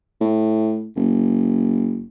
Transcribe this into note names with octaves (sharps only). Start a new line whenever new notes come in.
A2
F#1